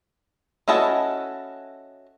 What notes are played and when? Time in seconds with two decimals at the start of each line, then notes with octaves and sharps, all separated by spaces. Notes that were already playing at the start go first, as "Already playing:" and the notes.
0.68 C#4 E4 F#4 A4 D#5